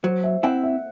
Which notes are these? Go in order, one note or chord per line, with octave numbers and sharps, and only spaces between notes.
F#3 C5
E5
C4 E4 F#5
E5